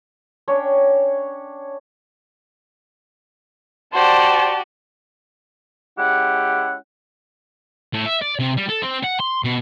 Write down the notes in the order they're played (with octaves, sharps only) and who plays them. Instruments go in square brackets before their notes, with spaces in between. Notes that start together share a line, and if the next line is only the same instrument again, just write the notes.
[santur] C#4 D4 C#5 G5
[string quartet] F#4 G4 [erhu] C5 [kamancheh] D5 A5
[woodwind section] G#3 C#4 E4 G4 F#5
[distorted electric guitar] A2
E5
D5
C3
G3
A4
C4
F#5
C6
B2